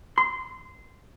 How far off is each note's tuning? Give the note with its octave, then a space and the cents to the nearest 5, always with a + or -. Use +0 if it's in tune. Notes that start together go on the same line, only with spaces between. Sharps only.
C6 -20